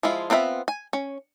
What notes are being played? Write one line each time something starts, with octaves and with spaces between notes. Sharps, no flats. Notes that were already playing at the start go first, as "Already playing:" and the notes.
F3 G#3 E4 F4
B3 C4 F4 C5 E5
G#5
C#4